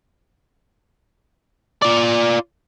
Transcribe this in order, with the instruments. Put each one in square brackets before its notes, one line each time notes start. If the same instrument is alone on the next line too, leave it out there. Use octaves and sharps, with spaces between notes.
[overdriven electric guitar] F4 D5